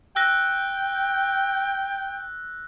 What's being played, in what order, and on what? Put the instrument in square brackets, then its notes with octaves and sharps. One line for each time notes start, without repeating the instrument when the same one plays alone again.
[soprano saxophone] G5 [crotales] E6 F#6 A#6